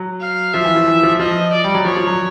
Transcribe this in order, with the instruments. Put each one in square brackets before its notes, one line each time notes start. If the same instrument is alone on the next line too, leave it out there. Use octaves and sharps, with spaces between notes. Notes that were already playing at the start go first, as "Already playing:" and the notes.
Already playing: [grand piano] F#3
[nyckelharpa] F5
[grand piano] F3 [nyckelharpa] E5
[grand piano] E3
F3
E3
F3
[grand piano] F3 [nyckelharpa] D#5
[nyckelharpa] D5
[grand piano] G3
F#3
[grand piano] F3 [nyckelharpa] C#5
[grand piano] F3
F#3